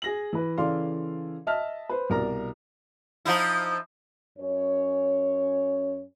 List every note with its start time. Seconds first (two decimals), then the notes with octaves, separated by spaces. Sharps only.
0.02 G#4 A#6 F#7
0.33 E3 B4
0.58 C#3 E3 A4 D5 F5 C6
1.47 D#5 E5 A5 F6
1.89 B4 C5
2.10 C2 B2 A#4 D5 A#5
3.25 F3 D#4 E4
4.38 F#2 C#4 C#5